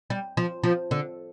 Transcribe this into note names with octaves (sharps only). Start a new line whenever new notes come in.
G3
F3
F3
D3